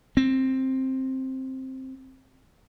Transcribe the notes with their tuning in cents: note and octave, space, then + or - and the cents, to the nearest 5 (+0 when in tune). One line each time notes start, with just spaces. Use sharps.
C4 +10